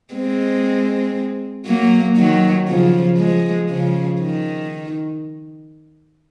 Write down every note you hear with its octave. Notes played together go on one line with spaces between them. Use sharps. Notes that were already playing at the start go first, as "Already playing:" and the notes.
G#3 C4
F#3 A#3
D#3 F#3
C#3 F3
F3 G#3
C#3 F3
D#3